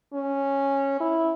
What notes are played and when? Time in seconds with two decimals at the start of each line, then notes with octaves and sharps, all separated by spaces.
0.14 C#4
1.00 E4